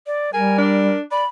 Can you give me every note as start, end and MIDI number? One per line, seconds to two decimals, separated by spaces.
0.07 0.33 74
0.33 0.94 55
0.33 0.98 70
0.33 0.54 80
0.58 1.02 62
1.11 1.23 74
1.11 1.26 83